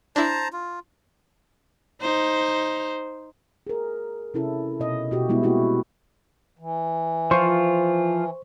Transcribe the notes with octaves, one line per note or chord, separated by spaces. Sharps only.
D4 E4 C5 A5 A#5
F4
D#4 C5
G#4 A#4
C3 C#4 E4 A4
B2 D#5
B2 F#4 G4
G3 G#3 B3 E4
A#3 C4 E4 F#4 G4
E3
F3 F4 C5 C#6